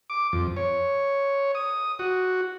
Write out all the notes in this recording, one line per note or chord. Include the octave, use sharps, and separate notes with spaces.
D6
F2
C#5
D#6
F#4